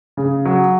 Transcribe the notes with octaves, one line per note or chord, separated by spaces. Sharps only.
C#3
F#3